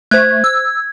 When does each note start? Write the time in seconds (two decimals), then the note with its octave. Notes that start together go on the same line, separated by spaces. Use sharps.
0.11 A3 C5 F#6 G#6
0.44 E6